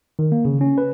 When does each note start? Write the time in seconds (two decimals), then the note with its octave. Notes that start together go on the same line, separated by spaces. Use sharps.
0.19 D#3
0.32 A#3
0.45 C#3
0.61 C#4
0.78 B4